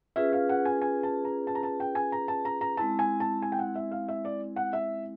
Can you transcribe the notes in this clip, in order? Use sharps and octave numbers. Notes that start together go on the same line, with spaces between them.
C#4 F4 G#4 B4 E5
F5
F#5
G#5
G#5
A5
A#5
A5
A#5
A5
G5
G#5
A#5
A5
A#5
A#5
G#3 C4 E4 A5
G#5
A5
G#5
G5
F#5
E5
F5
E5
D5
F#5
E5